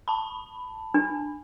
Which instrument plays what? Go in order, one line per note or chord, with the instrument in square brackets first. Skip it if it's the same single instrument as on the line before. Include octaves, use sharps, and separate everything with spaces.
[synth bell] A5 B5
[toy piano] D4